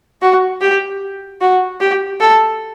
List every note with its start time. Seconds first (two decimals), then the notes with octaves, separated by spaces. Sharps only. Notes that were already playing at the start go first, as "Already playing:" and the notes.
0.21 F#4
0.61 G4
1.41 F#4
1.81 G4
2.20 A4